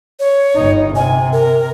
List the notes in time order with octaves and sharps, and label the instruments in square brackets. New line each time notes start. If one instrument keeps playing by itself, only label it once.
[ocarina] C#5
[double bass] G1 D#4
[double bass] C3 [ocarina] G#5
[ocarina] A#4